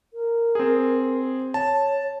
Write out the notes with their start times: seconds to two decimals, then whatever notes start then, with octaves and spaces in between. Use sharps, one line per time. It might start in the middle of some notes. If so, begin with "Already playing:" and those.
0.14 A#4
0.55 C4 G#4
1.54 C#5 A5